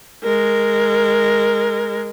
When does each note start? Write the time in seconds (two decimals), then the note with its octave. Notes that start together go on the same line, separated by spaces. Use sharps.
0.24 G#3 A#4